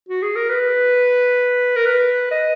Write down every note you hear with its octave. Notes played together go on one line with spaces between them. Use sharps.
F#4
G#4
A#4
B4
A#4
B4
D#5